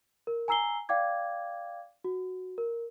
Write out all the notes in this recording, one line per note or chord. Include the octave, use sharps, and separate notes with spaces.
A#4
G#5 A#5 E6 C7 G7
D5 F5 G5 D6 G#6
F#4
A#4